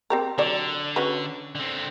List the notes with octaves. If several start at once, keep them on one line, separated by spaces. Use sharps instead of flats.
C4 G4 A#4
D3 F#3 D5
C#4 F#4 B4
D3 C4